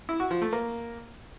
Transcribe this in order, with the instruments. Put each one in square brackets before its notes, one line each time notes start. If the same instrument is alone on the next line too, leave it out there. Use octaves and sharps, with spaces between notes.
[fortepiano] E4
F#4
F3
A3
A#3